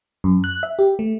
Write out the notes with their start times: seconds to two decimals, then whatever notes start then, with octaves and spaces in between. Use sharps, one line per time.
0.24 F#2
0.44 F#6
0.63 E5
0.79 G4
0.99 A3